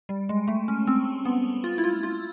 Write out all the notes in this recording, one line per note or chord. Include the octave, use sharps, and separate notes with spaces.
G3
G#3
A3
C#4
C4
B3
F4
E4
F4
F4